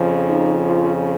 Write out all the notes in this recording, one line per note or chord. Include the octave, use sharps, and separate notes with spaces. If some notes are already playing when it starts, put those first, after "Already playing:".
Already playing: F2 C#3 F3
D#4
F4